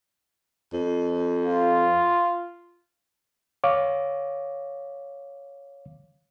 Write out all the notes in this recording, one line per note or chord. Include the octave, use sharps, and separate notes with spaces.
F2
F4
C#5 F5 D6